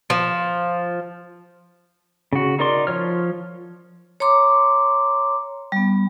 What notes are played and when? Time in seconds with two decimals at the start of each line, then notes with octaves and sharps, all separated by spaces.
0.10 F3
2.33 C#3 F#4
2.59 D#4 A#4 D5 C6
2.87 F3 C#5 F6
4.20 C#5 A#5 C6 D6
5.72 G3 B3